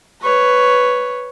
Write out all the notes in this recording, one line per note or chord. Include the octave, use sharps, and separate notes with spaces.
B4 C#5